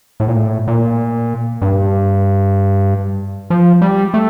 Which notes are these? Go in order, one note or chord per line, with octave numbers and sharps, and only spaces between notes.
A2
A#2
A2
A#2
G2
F3
G3
A3